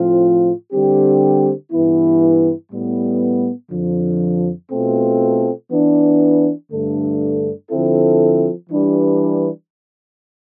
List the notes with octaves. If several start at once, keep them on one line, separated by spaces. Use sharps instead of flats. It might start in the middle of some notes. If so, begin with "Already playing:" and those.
Already playing: A2 F3 C4 F4
D3 G3 C4 G4
G2 E3 B3 E4
A2 G3 B3
F2 D3 F3
B2 A3 C4 F4 A4
E3 B3 D4
G2 D3 A3 D4 A4
D3 F3 C4 E4 A4
E3 G3 D4 G4 B4